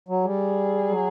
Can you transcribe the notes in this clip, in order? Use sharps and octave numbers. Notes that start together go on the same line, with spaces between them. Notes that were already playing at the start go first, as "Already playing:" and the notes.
F#3
G3 G#4
F#3